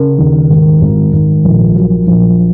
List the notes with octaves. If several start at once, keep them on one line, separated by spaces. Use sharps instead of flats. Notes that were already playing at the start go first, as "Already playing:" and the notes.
Already playing: C#3 A#4
D#2
G#1
G#1
G#1
A#1
F#3
A#1